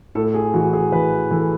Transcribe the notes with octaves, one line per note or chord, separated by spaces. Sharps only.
A2 A4
G#4
E3 F#4
G#4
E3 B4
E3 A4